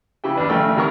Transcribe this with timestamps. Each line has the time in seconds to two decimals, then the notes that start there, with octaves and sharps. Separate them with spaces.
0.24 C#3 E4 G4 G5
0.35 D#2 D4 B4
0.49 A1 C#3 A3 G5 E6
0.77 C3 D#3 A#4 C#6